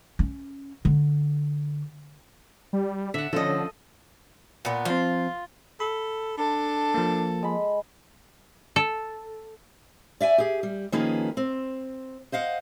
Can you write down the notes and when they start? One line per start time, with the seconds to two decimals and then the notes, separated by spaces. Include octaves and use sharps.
0.19 C#4
0.85 D3
2.73 G3
3.14 D3 E5 F#5
3.33 D3 F3 C#4 A4 D#5
4.65 A#2 B3
4.85 F3 C4 F4
5.80 A4 B5
6.37 D4 A4
6.94 F3 A#3
7.43 G#3 B5
8.76 A4
10.20 D5 E5 G5 G#5
10.38 G4 G#4
10.63 G3
10.92 D#3 F3 A#3 C#4 G#4 B4
11.37 C4
12.32 C5 D#5 F5 F#5